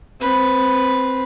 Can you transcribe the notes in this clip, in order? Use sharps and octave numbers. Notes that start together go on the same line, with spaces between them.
C4 B4